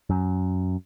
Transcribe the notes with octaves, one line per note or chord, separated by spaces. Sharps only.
F#2